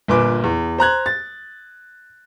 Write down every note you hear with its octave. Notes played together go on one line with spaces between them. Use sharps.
G1 A#2 B4 G#5 D6
E2
C5 A#5 F#6 G#6
A6